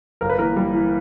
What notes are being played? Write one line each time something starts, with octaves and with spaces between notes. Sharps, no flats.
G1 A#4
B4
E3 A#3 A#4
G3
E3